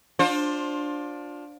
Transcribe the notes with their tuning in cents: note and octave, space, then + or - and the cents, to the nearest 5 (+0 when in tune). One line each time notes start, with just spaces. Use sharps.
D4 +0 F4 +25 C5 +15